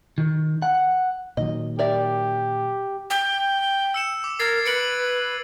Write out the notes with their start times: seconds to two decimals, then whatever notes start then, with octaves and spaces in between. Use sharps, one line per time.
0.18 D#3
0.62 F#5
1.37 A#2 D#3 F#3 D#5
1.79 G4 A#4 D5 E5
3.10 G5
3.94 E6 C#7 E7
4.24 D6
4.39 A#4 G#6 A6 C7
4.65 B4 C#7 D7 F#7